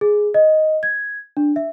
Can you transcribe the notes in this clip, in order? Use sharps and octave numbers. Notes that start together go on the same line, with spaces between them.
G#4
D#5
G#6
D4
E5